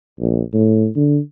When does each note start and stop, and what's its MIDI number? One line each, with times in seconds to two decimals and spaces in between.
0.20 0.41 34
0.53 0.87 45
0.96 1.19 50